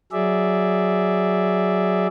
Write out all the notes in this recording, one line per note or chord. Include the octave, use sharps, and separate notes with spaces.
F#3 G#4 D5 E5